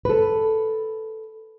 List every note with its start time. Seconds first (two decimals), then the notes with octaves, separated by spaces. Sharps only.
0.05 A4 B4